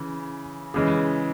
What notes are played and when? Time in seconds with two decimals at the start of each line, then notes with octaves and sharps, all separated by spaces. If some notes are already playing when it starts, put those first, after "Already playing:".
Already playing: C#3 E3
0.74 C#3 E3 G#3